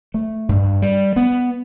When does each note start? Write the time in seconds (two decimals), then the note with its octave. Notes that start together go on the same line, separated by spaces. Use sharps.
0.14 A3
0.49 G2
0.82 G3
1.16 B3